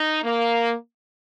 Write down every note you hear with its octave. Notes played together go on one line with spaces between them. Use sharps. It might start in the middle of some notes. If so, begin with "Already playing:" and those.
Already playing: D#4
A#3